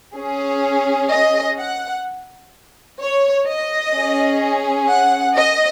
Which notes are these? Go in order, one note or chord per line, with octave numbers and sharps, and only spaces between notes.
C#4 G#4
D#5
F#5
C#5
D#5
C#4 G#4
F#5
D#5